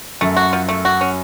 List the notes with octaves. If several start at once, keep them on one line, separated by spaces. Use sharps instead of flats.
F#2 A3
F#4
F3
A3
F#4
C#4